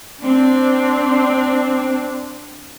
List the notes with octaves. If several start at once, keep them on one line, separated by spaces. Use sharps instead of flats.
C4 D4